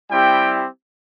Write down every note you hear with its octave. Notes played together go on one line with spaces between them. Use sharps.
G3 C4 E4 G4 G5